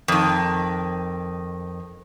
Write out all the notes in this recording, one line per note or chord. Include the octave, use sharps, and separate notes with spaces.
F2 D#3